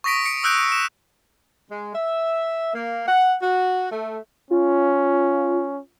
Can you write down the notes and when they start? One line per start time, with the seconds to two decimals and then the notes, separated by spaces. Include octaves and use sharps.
0.04 C#6 D#6 A#6 B6 D7
0.26 C#7 D7
0.43 D#6 E6 F#6 G6 D7
0.57 D7
0.72 E7
1.71 G#3
1.94 E5
2.74 A#3
3.07 F#5
3.42 F#4
3.91 A3
4.51 C#4 F4